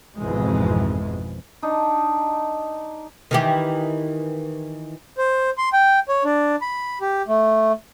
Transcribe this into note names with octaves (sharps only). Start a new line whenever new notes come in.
G#1 F2 G#2 B2 E3 G#3
D4 D#4
D#3 E3 G4
C5
C6
G5
C#5
D4
B5
G4
A3